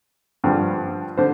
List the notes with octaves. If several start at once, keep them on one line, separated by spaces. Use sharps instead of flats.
G2 D3 F3
D3 C5